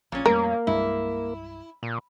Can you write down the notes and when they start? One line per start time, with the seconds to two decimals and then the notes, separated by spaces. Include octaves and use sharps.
0.12 A#1 A#2 C#4
0.26 F2 G3 A3 A#3 A#4
0.67 C2 G2 G#3 E4
1.83 A#2